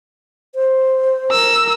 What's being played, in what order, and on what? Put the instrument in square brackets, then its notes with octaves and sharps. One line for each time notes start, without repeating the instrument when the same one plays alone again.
[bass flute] C5
[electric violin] A#4 E6